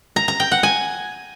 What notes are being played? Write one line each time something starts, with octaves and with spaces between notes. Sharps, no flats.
A#5
A#5
G5
F#5
G#5